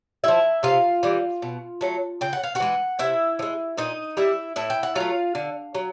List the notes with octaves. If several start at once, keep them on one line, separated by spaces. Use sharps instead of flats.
F3 G#3 E4 E5
C3 F4 F5
E3 G3
B2
F#3 A3
C#3 G5
F#5
F5
F#4 F#5
E3 G#3
C3 E4 E5
F3
G#3
A#2 D#4 D#5
G3 E4 E5
A2 E4 E5
G5
F#5
F#3 A3 F4 F5
D3
F#3